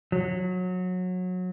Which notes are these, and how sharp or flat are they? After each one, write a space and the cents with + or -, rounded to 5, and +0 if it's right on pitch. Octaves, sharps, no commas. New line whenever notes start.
F#3 -20